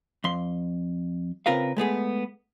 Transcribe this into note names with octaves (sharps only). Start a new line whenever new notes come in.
F2 C6
C#3 C4 F4 A#4 B4 F5
G#3 A3 B3 G#4